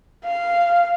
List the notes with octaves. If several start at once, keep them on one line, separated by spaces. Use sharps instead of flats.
F5